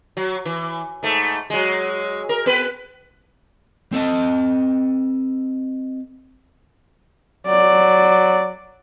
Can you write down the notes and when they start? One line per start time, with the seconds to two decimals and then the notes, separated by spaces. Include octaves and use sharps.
0.17 F#3
0.45 E3
1.03 G#2 A3
1.50 F#3 G#3
2.29 A#4
2.46 B3 B4
3.92 C4 A4 D#5 A5
7.47 F#3 D5